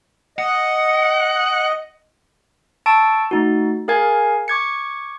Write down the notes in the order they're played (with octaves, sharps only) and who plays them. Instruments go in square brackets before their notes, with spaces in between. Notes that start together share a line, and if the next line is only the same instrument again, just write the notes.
[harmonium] D#5 [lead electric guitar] F#5
[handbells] A5 C#6 E6 D7
A3 D#4 F#4
G#4 A#4 F5 G#5 G#6
C#6 D6 G#6 C#7